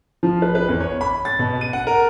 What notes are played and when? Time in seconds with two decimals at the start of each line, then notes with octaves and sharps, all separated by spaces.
0.23 F3
0.42 B4
0.55 B4
0.68 E2
0.80 C#5
1.01 B5
1.25 A6
1.39 B2
1.61 D#7
1.73 F#5
1.87 A#4